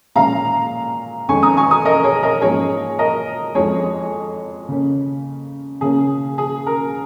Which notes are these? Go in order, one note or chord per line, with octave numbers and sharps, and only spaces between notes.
A#2 G#3 C#4 F5 A#5
F2 D#3 G#3 C#4 G#5 C#6
A#5 D#6
G#5 C#6
A#5 D#6
A#4 D#5
G#4 C#5
A#4 D#5
G#2 F3 A#3 C#4 G#4 C#5
A#4 D#5
F2 F3 G#3 G#4 C#5
C#3 A#3 C#4
C#3 A#3 C#4 G#4
G#4
A#4